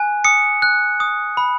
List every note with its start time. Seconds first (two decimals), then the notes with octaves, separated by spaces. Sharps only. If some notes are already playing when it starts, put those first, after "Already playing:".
Already playing: G#5 F#6
0.24 D#6 C#7
0.62 F#6
1.00 D#6
1.37 B5